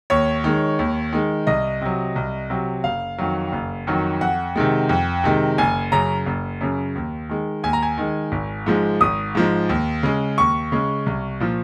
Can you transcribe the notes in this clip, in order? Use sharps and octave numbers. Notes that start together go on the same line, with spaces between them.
D#2 C#5
D#3 G#3
D#2
D#3 G#3
C2 D#5
C3 F#3
C2
C3 F#3
F#1 F5
F2 D#3 F#3
F#1
F2 D#3 F#3
F2 F#5
C3 D#3 G#3
F2
C3 D#3 G#3
F#1 G#5
F#2 C#3 A#5
F#1
F#2 C#3
D#2
D#3 G#3
D#2 G#5
A#5
G#5
D#3 G#3
G#1
G#2 F3 G#3
G#1 D#6
G#2 F3 G#3
D#2
C#3 G#3
D#2 C#6
C#3 G#3
C2
A#2 F3